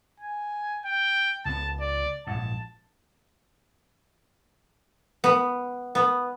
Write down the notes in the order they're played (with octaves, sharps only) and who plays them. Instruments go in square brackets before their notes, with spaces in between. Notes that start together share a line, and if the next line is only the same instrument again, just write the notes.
[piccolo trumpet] G#5
G5
[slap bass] C#2 B3 [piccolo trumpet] A5
[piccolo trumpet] D5
[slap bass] A#1 G#2 [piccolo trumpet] A5
[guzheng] B3
B3